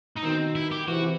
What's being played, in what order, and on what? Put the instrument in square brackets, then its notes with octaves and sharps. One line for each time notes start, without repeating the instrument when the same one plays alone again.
[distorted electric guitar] D#4
[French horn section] B2 D#3 [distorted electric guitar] C4
[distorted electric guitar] E4
G4
[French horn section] C3 E3 [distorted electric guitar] F#4